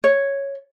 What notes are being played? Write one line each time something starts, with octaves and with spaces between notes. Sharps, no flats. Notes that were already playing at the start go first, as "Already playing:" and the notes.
C#5